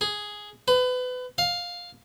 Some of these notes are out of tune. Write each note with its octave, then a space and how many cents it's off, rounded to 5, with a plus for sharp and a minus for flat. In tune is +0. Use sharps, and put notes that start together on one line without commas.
G#4 +0
B4 +30
F5 +10